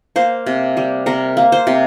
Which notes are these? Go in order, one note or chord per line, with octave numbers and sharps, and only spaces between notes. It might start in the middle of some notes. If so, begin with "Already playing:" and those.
A#3 C5
C3
G3
C3 A#4
A#3
C5
C3